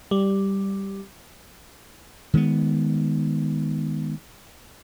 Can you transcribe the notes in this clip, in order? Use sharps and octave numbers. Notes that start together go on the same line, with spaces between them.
G3
D#3 G#3 B3